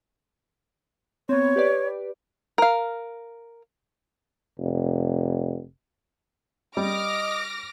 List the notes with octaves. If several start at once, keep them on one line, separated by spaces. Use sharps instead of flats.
B3 C4 C#5
G4 B4 D5
A#4 F5
F1
G3 D#5 D6 F6 A#6